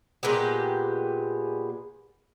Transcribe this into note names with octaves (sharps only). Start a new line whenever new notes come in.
A#2 G#3 B3 G4